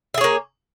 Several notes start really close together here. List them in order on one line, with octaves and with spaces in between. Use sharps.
E5 G#4 C#5 A#3